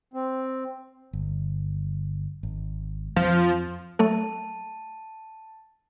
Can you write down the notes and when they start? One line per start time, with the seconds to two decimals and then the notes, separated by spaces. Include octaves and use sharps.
0.14 C4
1.13 G1
2.43 G#1
3.16 F2 F3
3.99 F#3 A3 A4 A5